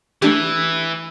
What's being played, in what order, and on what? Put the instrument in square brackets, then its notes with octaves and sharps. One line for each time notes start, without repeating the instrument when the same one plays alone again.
[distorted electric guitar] E3 [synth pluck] A3 D4 G4